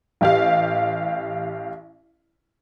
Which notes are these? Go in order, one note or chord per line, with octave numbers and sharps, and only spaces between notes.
A1 G4 F5